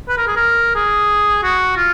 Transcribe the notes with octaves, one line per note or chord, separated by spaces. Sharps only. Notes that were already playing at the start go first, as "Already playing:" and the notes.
B4
A#4
G#4
A#4
G#4
F#4
F4